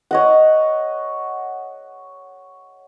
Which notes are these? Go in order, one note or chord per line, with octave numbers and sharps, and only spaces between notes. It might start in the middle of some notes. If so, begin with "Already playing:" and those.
C#5 D#5 F#5